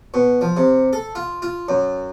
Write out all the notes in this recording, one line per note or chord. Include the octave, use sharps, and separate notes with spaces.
B2
F3
C3
A4
F4
F4
F#2